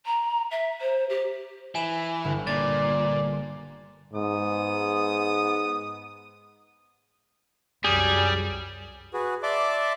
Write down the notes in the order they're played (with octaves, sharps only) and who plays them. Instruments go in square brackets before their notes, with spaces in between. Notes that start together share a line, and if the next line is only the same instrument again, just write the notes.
[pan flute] A#5
E5
C5
G4
[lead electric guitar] E3 [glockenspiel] G#5 E7 F#7
[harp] G1
[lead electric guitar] A#2 [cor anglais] D5 [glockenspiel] A6
[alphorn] G#2 [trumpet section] B3 D#6
[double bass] C2 F#2 [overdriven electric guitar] G3 [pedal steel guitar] G#4
[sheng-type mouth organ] F#4 G#4 B4
D5 E5 A5 C6 D6